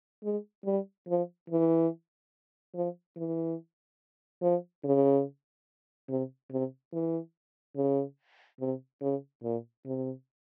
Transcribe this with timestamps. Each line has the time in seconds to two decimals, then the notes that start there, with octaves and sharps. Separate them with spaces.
0.24 G#3
0.65 G3
1.08 F3
1.50 E3
2.75 F3
3.16 E3
4.42 F3
4.84 C#3
6.09 C3
6.51 C3
6.93 E3
7.76 C#3
8.60 C3
9.02 C#3
9.43 A#2
9.86 C3